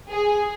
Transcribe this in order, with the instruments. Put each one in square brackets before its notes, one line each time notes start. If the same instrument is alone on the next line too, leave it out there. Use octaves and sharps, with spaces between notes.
[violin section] G#4